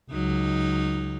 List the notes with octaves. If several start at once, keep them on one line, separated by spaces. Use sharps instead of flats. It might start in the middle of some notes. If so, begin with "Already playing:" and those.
C#2 F#3 D#4